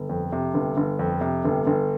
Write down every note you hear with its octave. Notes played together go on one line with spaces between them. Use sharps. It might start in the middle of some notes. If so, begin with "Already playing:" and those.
Already playing: G1
F2
C3
G1
G1
F2
C3
G1
G1